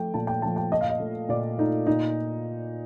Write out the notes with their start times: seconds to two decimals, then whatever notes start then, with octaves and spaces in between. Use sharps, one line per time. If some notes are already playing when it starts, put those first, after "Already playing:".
Already playing: F3 A3 G5
0.14 A#2 A5
0.27 G5
0.42 F3 A3 A5
0.56 G5
0.72 A#2 D#5
0.81 F5
0.89 D#5
1.00 A3
1.29 A#2 D5
1.58 A3 D#4
1.87 A#2 D#4